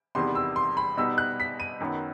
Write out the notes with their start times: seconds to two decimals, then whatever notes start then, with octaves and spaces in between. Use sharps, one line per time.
0.15 E2 C3 D#3 G3 B3 C6
0.35 E6
0.56 C6
0.77 B5
0.97 B2 G3 B3 D#4 E6
1.18 F#6
1.40 B6
1.60 D#7
1.80 F#2 D#3 F#3 B3